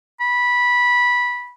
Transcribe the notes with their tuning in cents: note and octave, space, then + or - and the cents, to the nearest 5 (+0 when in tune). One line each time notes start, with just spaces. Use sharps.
B5 -15